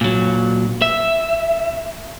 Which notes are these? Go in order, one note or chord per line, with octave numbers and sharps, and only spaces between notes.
A#2 F#3
E5